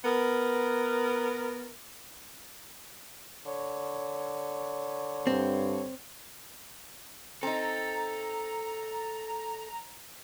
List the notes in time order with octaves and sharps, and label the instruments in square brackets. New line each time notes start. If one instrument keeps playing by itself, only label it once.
[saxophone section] B3 A#4
[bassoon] D3 [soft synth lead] C#5
[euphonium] G2 [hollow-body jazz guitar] C4
[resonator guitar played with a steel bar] C4 D#4 [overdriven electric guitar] A4 [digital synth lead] A#5